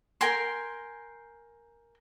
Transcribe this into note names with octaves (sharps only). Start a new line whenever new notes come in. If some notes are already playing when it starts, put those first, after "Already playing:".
A#4 G5 G#5 C6